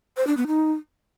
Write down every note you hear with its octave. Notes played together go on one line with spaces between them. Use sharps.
C5
D4
B3
D#4